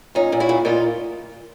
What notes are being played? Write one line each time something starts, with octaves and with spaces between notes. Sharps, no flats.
A#2 C#4 D#4
A#2
E4 F#4
A#2
A#2 D#4 F4